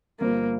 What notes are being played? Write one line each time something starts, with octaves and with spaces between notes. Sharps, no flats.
G1 G2 F3 A#3 C4 F4